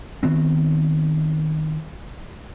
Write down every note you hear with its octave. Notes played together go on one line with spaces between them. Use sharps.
D#3 B3 C4